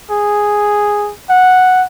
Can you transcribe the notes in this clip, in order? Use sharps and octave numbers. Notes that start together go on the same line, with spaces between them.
G#4
F#5